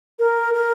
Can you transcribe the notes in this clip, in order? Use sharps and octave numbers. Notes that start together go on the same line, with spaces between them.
A#4
A#4